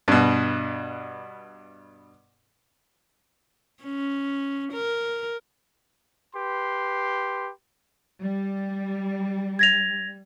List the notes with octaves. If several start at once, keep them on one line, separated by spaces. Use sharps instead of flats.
G2 B2
C#4
A#4
G4 B4 C6
G3
G#6 A#6 F7